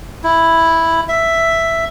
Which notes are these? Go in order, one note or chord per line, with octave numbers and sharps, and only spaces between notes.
E4
E5